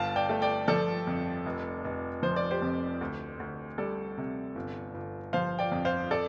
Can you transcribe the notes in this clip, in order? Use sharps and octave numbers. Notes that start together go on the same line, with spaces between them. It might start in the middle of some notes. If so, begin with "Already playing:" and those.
Already playing: G1 F5 A5
D5 G5
A3
D5 G5
F3 A4 D5
F2
F1
F1
F3 C5
D5
G4 C5
F2
D2
D2
G3 A4 D5
C3
G1
G1
F3 C5 F5
D5 G5
F2
C5 F5
A4 D5